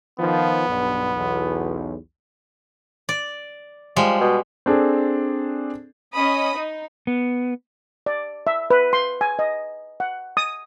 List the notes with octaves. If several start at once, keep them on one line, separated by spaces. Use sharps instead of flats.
D#3 F3 B3
B1 G2
B1 E2
D5
F3 G3 G#3
B2
C4 D4 G#4 A4
C#4 D#5 B5 D#6
D#4
B3
D5
E5
B4
C6
G#5
D#5
F#5
D#6